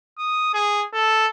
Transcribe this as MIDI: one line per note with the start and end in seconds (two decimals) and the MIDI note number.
0.18 0.49 87
0.54 0.85 68
0.93 1.27 69